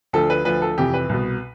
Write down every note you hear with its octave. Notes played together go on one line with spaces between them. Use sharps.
D2 D3 F3 A4
B4
D2 D3 F3 B4
A4
F2 C3 E3 G4
B4
C2 B2